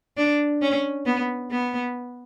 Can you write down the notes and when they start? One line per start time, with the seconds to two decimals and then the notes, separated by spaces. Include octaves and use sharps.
0.17 D4
0.62 C#4
1.06 B3
1.51 B3